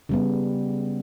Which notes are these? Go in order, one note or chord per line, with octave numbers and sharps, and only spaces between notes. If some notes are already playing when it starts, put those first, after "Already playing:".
C#3 G3 B3